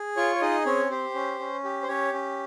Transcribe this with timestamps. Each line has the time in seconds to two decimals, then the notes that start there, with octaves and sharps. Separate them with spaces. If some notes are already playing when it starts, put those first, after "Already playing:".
Already playing: G#4
0.17 F4 C#5 C#6
0.35 C#5
0.41 D#4 G#4 D#5
0.66 C4 C#4 C#5
0.90 G4 C5
1.14 C#4
1.40 C#4
1.64 G4
1.83 C5
1.88 C#4 G4 C#5
2.13 C#4